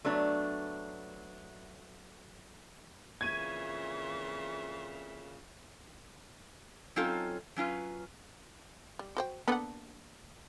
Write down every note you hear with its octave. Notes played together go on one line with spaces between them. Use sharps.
F#3 A3 B3 D4
F2 A#2 C#3 E3 E5 C#6 G#6 D#7
F#3 C4 C#4 D#4 F4 A4
F#3 C#4 F4 B4
G3
F#4 C5 G5
A#3 B3 D4 A4 F#5